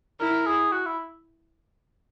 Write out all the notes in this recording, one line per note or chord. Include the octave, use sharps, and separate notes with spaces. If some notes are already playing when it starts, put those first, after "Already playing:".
E4 A#4
G#4
F#4
E4